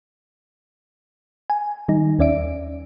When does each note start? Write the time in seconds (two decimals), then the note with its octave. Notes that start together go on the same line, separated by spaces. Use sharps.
1.50 G#5
1.88 D#3 G3 D#4
2.19 D#2 C#4 D5 E5 D7